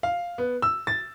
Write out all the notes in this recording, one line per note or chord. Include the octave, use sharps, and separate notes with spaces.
F5
B3
E6
A6